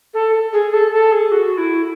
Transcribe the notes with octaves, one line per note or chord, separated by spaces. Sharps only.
A4
G#4
A4
A4
G#4
F#4
E4